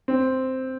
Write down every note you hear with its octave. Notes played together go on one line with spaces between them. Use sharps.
C4